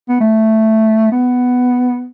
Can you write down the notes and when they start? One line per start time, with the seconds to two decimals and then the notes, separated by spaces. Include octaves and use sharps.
0.09 B3
0.21 A3
1.12 B3